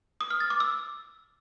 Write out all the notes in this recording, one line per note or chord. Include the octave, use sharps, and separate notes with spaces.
D#6
F6
A6
D6
E6